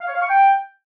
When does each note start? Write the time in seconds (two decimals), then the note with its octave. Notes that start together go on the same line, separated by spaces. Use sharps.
0.01 F5
0.08 C#5
0.15 F5
0.22 C#6
0.29 G5